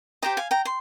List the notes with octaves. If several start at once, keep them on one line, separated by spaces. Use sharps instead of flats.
G4 C5 D#5 G5 A#5
F5 G#5
G5 A#5
C6